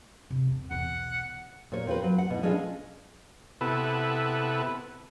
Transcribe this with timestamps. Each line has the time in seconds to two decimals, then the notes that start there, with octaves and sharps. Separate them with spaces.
0.30 C3
0.47 F2 C4
0.71 B1 E2 F#5
1.72 A#2 C#5
1.87 C4 F4 A#4 B4
2.04 F#3
2.18 F#5
2.30 B2 E4
2.43 G#3 C#4 D4 F4 A4
3.61 C3 B3 E4 A4 B4